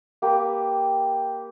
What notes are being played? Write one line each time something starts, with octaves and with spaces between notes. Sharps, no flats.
A#3 G4 B4